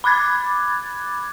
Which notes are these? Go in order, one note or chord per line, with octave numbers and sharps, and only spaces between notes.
B5 D6 F#6 G#6 A6